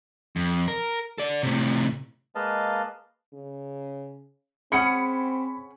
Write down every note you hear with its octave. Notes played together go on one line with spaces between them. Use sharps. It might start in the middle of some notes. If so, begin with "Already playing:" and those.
F2
A#4
A4 D5
A2 C3
G#3 A#3 B4 D#5 F5 A5
C#3
C4 C#4 G#4 F#5 B5 C#7